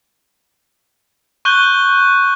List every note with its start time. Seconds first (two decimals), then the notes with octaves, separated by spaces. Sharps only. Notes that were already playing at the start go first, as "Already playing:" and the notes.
1.45 C#6 F#6 G6 G7